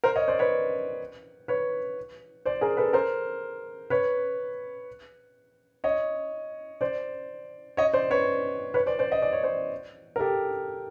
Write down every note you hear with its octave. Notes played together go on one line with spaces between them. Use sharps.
A#4 C5
C#5 D#5
C5 D5
B4 C#5
B4 C#5
C5 D5
G#4 A#4
A4 B4
A#4 C5
B4 C#5
C#5 D#5
C5 D5
C#5 D#5
C5 D5
B4 C#5
B4 C#5
C5 D5
C5 D5
D#5
D5
C#5
C5 D5
A#4
G4 A4